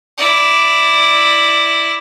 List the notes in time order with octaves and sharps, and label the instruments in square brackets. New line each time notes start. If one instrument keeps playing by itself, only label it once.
[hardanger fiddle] E4 D5